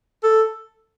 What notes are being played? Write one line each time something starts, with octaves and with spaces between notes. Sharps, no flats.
A4